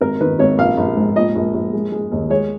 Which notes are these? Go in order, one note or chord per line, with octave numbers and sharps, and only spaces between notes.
G#1 A#4
D#3 B4
G#1 C#5
A#1 F5
A#1
G#2
A#2 D#5
A#1
A#1
G#3
G#3
D#2
G#3 C#5